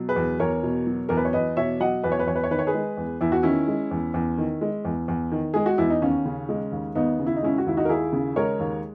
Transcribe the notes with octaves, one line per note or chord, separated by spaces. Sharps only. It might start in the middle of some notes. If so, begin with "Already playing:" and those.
Already playing: B2 F#3
G#4 B4
E2
E2 A#4 C#5
B2
F#3
E2 A#4
B4
C#5
E2 B4 D#5
B2 C#5 E5
F#3 D#5 F#5
E2 B4
C#5
B4
E2 C#5
B4
C#5
D#3 B4
C#5
G#4 B4
G#3
E2
E2 E4
F#4
D#3 C#4 E4
G#3
E2
E2
D#3
G#3
E2
E2
D#3
G#3 G#4
F#4
E2 E4
D#4
D#2 C#4
C#3
G#3
D#2
D#2 B3 D#4
C#3
E4
D#4
G#3 C#4 E4
F#4
D#2 E4
D#4 F#4
A#4
D#2 E4 G#4
C#3
G#3 A#4 C#5
D#2